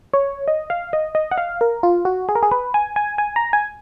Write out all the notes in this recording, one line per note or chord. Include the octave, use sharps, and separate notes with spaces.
C#5
D#5
F5
D#5
D#5
F#5
F5
A#4
F4
F#4
G#4
A#4
G#4
B4
G#5
G#5
G#5
A#5
G#5